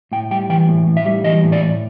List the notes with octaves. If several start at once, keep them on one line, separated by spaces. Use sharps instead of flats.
A2 G5
G3 G5
E3 G5
A2
A2
E5
G3
E3 D#5
A2
D5
A2